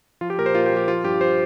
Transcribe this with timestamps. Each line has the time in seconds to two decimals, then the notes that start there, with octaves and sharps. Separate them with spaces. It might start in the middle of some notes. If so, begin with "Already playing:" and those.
0.21 F3 F4
0.30 G4
0.38 A#2 A#4
0.46 C5
0.55 A#2 F4
0.66 G4
0.71 F3
0.77 G4
0.88 F3 F4
1.04 G2 G4
1.21 C5